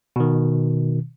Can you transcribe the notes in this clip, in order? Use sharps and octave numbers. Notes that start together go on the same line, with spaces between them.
B2 D#3